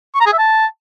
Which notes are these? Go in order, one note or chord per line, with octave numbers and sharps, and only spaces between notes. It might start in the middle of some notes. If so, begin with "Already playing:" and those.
C#6
A#5
G#4
E5
A5